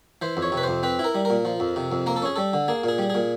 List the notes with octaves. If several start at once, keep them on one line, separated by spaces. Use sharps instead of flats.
E3 C5
F2
C#5
C3
B4
F2 C5
C4 B4
E4
A#4
G3
A#2 A#4
F3
F2
C3
F2
A#3 A#4
A4
C#4 G#4
G3 A4
D3
A#3 G#4
A#2 G#4
G3
A#2 G#4